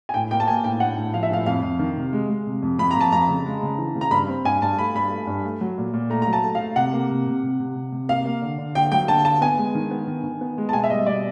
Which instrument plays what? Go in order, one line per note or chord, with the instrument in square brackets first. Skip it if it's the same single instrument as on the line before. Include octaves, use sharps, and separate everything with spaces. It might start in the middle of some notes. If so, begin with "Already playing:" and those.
[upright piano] G#5
[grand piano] A2 [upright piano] G5
[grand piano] A#3 [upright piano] G5
[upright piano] A5
[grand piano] A#3 [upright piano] G#5
[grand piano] A2 [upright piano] G5
[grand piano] D4 [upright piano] F#5
[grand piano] A2
[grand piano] F3 [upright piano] F5
[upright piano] E5
[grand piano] A2 [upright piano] F5
[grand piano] F2 [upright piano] F5
[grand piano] F2
D#3
C3
G#3
G#3
C3
F2
[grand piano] F2 [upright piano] B5
[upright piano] A#5
[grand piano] F2 [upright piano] A5
[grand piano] F2 [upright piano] A#5
[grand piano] C#3
G#3
C#3
E3
C#3
[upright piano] A#5
[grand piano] G2 [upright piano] B5
[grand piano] C4
[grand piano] G2 [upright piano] G#5
[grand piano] G2 [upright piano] A5
[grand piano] A3 [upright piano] B5
[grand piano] G2 [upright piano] B5
[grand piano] A3
G2
A3
F#3
A#2
A#2
[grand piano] A3 [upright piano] A#5
[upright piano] A#5
[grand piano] F#3
[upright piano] A5
[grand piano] A3
[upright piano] F5
[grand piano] A3
[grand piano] C3 [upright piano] F#5
[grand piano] A#3
C3
C3
C3
C3
C3
C3
[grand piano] A#3 [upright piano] F5
[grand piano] A#3
D3
D3
[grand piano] D3 [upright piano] G5
[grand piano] F#3 [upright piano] G5
[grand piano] D3 [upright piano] A5
[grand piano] D3 [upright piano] A5
[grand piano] B3 [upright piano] G#5
[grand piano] G#3
D#3
B3
D#3
D#3
B3
G#3
[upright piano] A5
[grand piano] B2 [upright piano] G#5
[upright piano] E5
[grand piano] G3 [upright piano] D#5
[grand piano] B2 [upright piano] D5